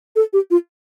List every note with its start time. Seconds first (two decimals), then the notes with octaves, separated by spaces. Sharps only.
0.16 A4
0.33 G4
0.51 F4